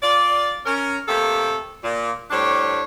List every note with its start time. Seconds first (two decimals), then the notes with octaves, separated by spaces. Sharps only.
0.03 F4 D5
0.66 C#4 A#4
1.08 C3 A3 A#3 G4 A4
1.83 A#2
2.31 A2 G3 D4 C5 C#5